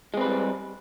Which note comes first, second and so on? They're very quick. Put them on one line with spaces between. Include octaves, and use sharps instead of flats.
G#3 C4 B4 G3